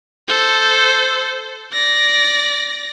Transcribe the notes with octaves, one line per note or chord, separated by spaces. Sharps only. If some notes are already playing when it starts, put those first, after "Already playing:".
A4 C5
D5 A#6